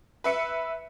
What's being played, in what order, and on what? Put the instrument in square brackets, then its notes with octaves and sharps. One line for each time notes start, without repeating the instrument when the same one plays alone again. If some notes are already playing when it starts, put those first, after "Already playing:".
[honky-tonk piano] B4 E5 C#7